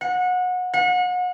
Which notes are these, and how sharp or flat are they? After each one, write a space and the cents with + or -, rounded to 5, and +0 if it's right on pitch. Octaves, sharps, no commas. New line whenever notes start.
F#5 -25
F#5 -35